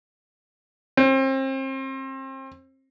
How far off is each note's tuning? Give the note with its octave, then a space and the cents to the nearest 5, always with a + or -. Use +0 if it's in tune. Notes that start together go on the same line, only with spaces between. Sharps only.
C4 +35